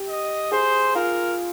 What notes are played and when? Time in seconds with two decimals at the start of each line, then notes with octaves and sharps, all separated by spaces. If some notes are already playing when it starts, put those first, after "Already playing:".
Already playing: G4
0.09 D#5
0.52 G#4 C5
0.95 F4 A#4